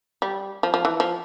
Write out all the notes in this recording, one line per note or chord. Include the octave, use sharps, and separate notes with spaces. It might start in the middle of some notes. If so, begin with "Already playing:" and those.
G3
F3
F3
E3
F3